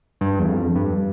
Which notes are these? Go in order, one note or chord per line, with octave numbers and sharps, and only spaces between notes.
G2
E2
F2
G2